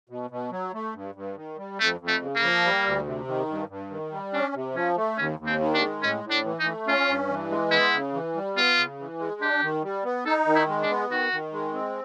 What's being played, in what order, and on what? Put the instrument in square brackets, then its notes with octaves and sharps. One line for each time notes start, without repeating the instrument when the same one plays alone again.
[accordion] B2
B2
F#3
A3
G2
G2
D#3
G3
[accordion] F2 [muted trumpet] A3
[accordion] F2
[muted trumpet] A3
[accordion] C#3
[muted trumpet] A#3
[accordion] F3
G3
D2
C3
D#3
G2
G2
D#3
G3
[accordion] C#4 [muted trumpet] D4
[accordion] C3
[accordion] F3 [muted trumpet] C#4
[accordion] A3
[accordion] D#2 [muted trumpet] C#4
[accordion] D#2
[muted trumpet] C4
[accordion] D#3
[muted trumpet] D4
[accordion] G#3
[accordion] A2 [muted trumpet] C#4
[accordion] A2
[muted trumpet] D4
[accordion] E3
[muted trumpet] D#4
[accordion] A3
[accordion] C#4 [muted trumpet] F4
[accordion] G2
E3
G#3
[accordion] B3 [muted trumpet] E4
[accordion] C#3
E3
G3
[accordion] B3 [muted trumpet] F4
[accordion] C#3
E3
G#3
[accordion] D4 [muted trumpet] G4
[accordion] D#3
G3
B3
[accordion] D#4 [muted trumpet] A4
[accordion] D#3
[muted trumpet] E4
[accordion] G#3
[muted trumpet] D4
[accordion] B3
[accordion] D#3 [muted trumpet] F#4
[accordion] D#3
G#3
C4